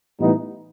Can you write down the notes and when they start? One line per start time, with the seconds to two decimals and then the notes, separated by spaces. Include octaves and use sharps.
0.19 A2 E3 G3 B3 D#4